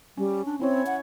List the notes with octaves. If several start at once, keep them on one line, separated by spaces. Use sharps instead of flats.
G3 C#4
D4
C4 C#4 E4 C#5
F#5